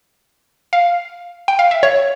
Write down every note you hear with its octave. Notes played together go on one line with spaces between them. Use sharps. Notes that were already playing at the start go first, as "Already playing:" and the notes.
F5
G5
F5
E5
C#5